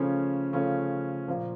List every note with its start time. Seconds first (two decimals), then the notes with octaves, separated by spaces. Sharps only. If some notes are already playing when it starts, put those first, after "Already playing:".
Already playing: C#3 F3 A3 C#4 F4
0.53 C#3 F3 A3 C#4 F4
1.28 A#2 F3 A#3